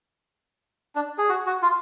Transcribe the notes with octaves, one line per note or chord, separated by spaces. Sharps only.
D4
G#4
F#4
F#4
F4